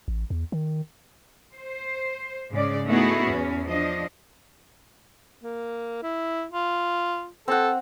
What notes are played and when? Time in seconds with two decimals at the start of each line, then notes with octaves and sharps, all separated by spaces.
0.08 A1
0.30 E2
0.52 D#3
1.54 C5
2.52 G#2 C#3 C#4 D5
2.86 A3 B3 D#4 E4 F#4 G#4
3.27 E2 C#4
3.65 F3 D4 D#5
5.43 A#3
6.03 E4
6.51 F4
7.48 C4 A4 F#5